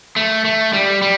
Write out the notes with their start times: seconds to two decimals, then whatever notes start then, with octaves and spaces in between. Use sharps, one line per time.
0.16 A3
0.45 A3
0.73 G3
1.02 G3